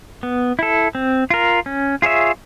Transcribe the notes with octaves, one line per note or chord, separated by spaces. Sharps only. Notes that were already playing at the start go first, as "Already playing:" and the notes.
B3
E4 A4
C4
F4 A#4
C#4
F4 G#4 C#5 E5